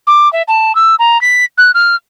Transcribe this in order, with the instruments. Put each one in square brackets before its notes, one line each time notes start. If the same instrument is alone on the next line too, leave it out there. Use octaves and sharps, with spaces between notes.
[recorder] D6
E5
A5
E6
A#5
B6
F#6
F6